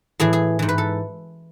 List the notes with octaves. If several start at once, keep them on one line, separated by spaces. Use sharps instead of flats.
A2 E3 G#4
G#4
G#2 E3
B4
A4